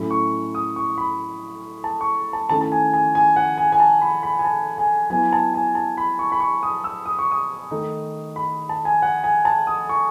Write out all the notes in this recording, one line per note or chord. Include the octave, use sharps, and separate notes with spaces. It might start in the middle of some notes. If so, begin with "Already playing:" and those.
Already playing: A2 F#3 A3 C#4 E4
C#6
D#6
C#6
B5
A5
C#6
A5
D#3 A3 C#4 E4 A5
A5
G#5
G#5
G#5
F#5
G#5
G#5
A5
B5
B5
G#5
A5
G#5
F#3 B3 E4 G#5
A5
G#5
A5
B5
C#6
B5
C#6
D#6
E6
D#6
C#6
D#6
D#3 A3 D#4
B5
A5
G#5
F#5
G#5
A5
D#6
C#6